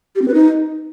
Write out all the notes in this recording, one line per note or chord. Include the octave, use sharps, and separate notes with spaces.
G4
C4
B4
D#4